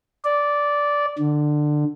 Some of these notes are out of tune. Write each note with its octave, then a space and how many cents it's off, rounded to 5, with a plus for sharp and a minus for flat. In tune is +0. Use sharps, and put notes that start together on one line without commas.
D5 -10
D3 +20